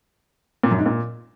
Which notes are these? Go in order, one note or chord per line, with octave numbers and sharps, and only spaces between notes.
A#2
F#2
G#2
A#2